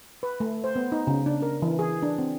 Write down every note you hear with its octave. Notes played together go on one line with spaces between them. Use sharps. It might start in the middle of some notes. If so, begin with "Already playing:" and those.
B4
A3
C5
B3
D#4
C#3
D4
A#4
E3
G#4
D4
C4